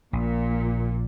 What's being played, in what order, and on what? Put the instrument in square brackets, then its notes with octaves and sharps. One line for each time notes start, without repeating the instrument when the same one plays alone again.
[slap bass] A#1 [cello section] A#2